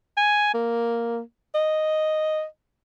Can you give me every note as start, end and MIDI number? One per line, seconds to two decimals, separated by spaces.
0.17 0.52 80
0.54 1.20 58
1.55 2.45 75